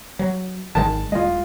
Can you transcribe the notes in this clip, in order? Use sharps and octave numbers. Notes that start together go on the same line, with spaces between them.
F#3
G#1 D#3 G#3 A5
D#1 G#3 F4 D#5